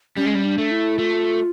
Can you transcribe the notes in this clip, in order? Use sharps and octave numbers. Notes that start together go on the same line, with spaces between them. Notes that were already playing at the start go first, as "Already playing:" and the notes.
G3 C#4
G#3
G3
D4
A3
E4
A3 F4